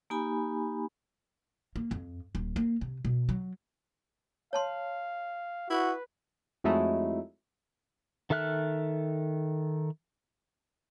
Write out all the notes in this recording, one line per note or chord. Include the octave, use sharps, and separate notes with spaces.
A#3 D#4 G4 G#5 B5
A#3
F2
D#1
A#3
C3
B2
F#3
C#5 F5 A5 C6
E4 F#4 B4
F2 F#3 G#3 A3 D#4 E4
D#3 A4 E5 F6 F#6